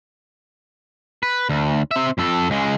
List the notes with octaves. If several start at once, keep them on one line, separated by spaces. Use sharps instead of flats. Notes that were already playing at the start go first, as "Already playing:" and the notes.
B4
D2
C4 E5
F2 A4
C#2 G#3